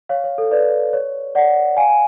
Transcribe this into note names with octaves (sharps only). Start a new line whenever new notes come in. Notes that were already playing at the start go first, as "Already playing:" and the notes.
C#5 F5
C#5
A4
B4 D5
C#5
D5 F#5
F5 G#5
G#5